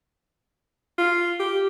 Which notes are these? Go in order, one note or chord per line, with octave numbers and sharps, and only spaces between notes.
F4
G4